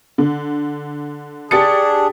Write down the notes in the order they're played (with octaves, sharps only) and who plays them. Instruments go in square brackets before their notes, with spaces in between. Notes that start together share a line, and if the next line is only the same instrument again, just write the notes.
[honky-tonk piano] D3
[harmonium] D4 G#4 [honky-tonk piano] G4 A6 C#7